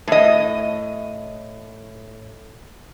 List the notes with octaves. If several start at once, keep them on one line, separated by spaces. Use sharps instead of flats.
A2 D#5